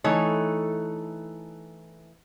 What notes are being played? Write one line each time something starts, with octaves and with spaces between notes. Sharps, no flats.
E3 A3 D#4 A4 C#5